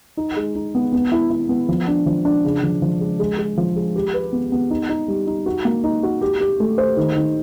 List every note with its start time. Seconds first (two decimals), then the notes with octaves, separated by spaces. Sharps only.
0.17 D#4
0.37 G#3
0.55 D#4
0.75 B3
0.93 B3
1.12 E4
1.30 E4
1.49 B3
1.69 F3
1.87 D4
2.06 F3
2.25 D4
2.44 C#3
2.63 F3
2.82 F3
3.01 G#3
3.19 G#3
3.39 G#3
3.57 F3
3.76 G#3
3.96 G4
4.14 B4
4.33 B3
4.52 B3
4.70 D#4
4.89 D#4
5.08 G3
5.27 D#4
5.46 F#4
5.65 A#3
5.84 D#4
6.03 F#4
6.21 G4
6.40 G4
6.60 A3
6.78 C5
6.97 D#3
7.16 D#3